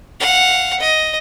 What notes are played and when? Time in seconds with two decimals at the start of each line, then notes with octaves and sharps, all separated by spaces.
0.20 F5 F#5
0.79 D#5